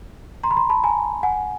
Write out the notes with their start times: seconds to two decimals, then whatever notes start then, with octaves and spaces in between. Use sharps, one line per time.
0.43 A#5 C6
0.51 B5
0.57 A#5 C6
0.69 A5 B5
0.83 G#5 A#5
1.23 F#5 G#5